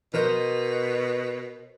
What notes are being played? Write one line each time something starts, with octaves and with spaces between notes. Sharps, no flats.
B2 A#4 C5 D#5